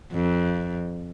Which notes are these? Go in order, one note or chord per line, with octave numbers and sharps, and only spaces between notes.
F2